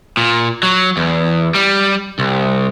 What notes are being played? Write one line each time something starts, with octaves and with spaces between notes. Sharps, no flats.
A#2
F#3
E2
G3
C2